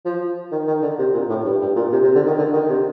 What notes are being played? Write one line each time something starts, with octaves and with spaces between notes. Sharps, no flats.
F3
D#3
D#3
D3
C3
A#2
A2
G2
G2
A#2
C3
C3
D3
D#3
D3
D#3
C3